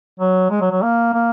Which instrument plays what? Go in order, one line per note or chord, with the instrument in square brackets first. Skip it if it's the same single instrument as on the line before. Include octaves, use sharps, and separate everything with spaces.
[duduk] F#3
G#3
F#3
F#3
A#3
A#3